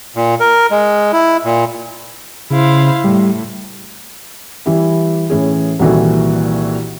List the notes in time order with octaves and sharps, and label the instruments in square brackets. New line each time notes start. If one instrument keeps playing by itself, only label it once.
[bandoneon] A#2
A#4
G#3
E4
A#2
[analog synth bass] C#3 [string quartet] E4 C5 F5
[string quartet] A2 [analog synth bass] G3
[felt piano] E3 G3 E4
A2 E3 C#4 G#4
C2 A#2 D#3 E3 F#4 A4